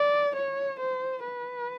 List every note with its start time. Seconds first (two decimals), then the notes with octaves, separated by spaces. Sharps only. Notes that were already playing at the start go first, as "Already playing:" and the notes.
Already playing: D5
0.36 C#5
0.80 C5
1.25 B4